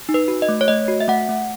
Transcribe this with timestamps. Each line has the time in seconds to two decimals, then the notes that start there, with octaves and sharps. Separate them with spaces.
0.09 D#4
0.14 B4
0.28 F#4
0.42 D#5
0.48 A3
0.61 C#5
0.68 A3 D#5
0.88 F#4
1.00 E5
1.08 A3 F#5
1.29 A3